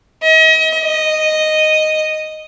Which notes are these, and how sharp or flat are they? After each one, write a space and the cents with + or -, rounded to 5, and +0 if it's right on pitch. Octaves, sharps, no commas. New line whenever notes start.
D#5 +40
D#5 -5